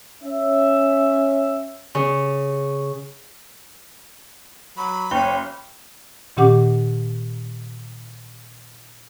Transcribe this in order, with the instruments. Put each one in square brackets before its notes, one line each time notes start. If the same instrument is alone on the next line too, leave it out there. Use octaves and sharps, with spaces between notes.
[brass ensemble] C#4 E5
[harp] C#3
[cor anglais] F#3 [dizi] B5
[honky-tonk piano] F#1 [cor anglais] C#4 [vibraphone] G5
[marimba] A#2 D#3 C#4 G4 F#5 D6